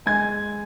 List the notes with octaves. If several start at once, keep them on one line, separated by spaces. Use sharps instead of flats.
G#3 G#5 G#6